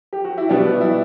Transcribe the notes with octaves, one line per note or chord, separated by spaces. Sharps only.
G4
F#4
E4
B2 G3 B3 D4
E4